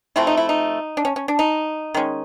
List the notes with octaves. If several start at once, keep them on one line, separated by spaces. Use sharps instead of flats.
C3 F3 A3 C4 E4
D#4
E4
D#4
D4
C#4
C#4
D4
D#4
D#3 G#3 C#4